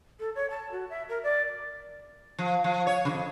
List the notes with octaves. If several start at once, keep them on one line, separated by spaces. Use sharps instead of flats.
A4
C#5
A5
F#4
E5
A#4
D5
F3
F3
C#5
F2 C#3